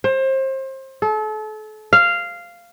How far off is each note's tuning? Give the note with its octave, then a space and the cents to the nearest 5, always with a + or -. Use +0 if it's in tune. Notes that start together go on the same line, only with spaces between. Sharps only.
C5 +30
A4 -35
F5 -10